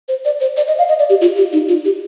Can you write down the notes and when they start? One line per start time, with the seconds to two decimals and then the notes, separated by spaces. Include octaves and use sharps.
0.08 C5
0.25 D5
0.41 C5
0.57 D5
0.68 D#5
0.78 F5
0.89 D#5
0.99 D5
1.10 G4
1.21 F4
1.37 G4
1.53 D#4
1.69 F4
1.85 G4